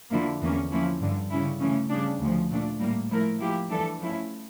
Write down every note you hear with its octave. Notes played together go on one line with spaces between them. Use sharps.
F2 D3 F3 A#3 E4
E2 E3 A#3 C#4
F3 A#3 C#4 E4
G2 D3 G3
C#3 G3 C#4 E4
C#3 E3 A3 C#4
C#3 G3 D4
D2 C#3 F3
A#2 A3 D4
A2 G3 A#3
F3 A3 E4 A#4
F3 A#3 E4 G4
E3 G3 D4 A4
F3 A3 C#4 E4